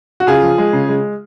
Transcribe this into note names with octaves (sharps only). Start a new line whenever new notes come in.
F#4
C#3 F4 G#4
F3
G#3
C#3
G#3